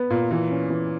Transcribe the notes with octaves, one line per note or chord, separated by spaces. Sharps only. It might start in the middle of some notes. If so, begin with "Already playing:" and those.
Already playing: B3
A#2
E3
C#4
E3